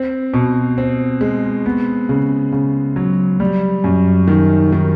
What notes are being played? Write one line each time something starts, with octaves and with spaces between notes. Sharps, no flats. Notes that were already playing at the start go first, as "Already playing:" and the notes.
Already playing: C4
B2
C4
G#3
B3
C#3
C#3
F#3
G3
F#2
D#3
D#3